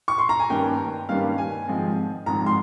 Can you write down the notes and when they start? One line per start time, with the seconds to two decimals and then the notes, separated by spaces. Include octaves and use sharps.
0.08 C#6
0.18 C6
0.29 A#5
0.39 G#5
0.49 G2 D#3 G3 A#3 C#4 G5
1.09 G2 D#3 G3 A#3 C#4 F5
1.38 G#5
1.67 G#1 G#2 F3 G#3 C4
2.26 G#1 G#2 F3 G#3 C4 A#5
2.46 C6